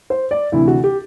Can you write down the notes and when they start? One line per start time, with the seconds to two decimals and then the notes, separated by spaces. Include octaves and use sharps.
0.10 C5
0.31 D5
0.52 D2 C3 E3 E4
0.68 F#4
0.84 G4